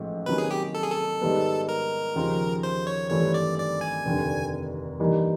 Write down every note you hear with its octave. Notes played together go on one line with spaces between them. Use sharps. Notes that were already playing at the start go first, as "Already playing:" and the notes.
Already playing: A1 G#2 F3 A3
C3 D#3 F#3 A#3 C#4 B4
G#4
G4
A4
G#4
A4
G#2 D#3 G3 B3
A#4
D#2 C#3 F3 G#3
C5
C#5
G#1 G2 E3 A3 C#5
D5
D5
G#5
F1 D#2 D3
G2 E3 G3 A#3 D#4